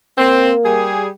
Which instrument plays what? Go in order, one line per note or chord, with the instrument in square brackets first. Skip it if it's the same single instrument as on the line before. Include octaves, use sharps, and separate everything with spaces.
[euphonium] A#3 [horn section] C4
[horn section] G3 G#4